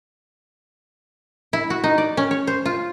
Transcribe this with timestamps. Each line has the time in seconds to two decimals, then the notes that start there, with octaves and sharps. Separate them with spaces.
1.53 E4
1.70 F#4
1.84 D#4
1.98 D5
2.17 C#4
2.31 C#5
2.47 C5
2.65 F4